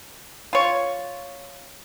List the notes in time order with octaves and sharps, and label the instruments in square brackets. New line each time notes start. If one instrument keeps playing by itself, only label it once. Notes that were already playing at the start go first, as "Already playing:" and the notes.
[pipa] F4 C#5